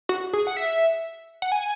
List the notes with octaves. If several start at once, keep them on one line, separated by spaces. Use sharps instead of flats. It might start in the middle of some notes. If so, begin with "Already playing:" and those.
F#4
G#4
F#5
E5
F#5
G#5